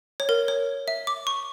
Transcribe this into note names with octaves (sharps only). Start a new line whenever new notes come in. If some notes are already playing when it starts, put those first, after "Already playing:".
C#5
A#4
C#5
E5
D6
C#6